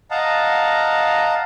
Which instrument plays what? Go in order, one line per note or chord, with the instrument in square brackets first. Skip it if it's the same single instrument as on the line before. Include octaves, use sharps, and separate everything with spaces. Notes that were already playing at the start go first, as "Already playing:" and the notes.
[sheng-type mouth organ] D#5 F5 F#5 A5 A#5